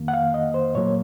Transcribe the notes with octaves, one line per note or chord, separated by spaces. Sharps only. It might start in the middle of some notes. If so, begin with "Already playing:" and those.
Already playing: F2 D#3 A#3
F#5
F5
D#5
C5
A#2 F#3 A#3 C#5